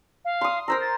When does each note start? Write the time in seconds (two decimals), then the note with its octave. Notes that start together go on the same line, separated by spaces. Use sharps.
0.25 F5
0.41 C6 D#6
0.68 A#4 C5 A#5 E6
0.81 A6